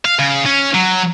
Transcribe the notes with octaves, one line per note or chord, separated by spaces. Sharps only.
F5
C#3
C#4
F#3